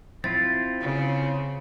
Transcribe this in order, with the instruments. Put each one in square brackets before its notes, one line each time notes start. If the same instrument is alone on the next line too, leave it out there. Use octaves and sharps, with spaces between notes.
[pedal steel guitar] C4 E4 F4 [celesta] A6
[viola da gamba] C#3